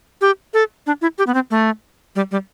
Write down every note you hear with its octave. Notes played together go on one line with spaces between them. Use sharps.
G4
A4
D4
E4
G4
B3
C4
A3
G3
G3